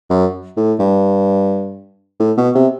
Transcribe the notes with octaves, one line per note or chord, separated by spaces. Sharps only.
F#2
A2
G2
A2
B2
C3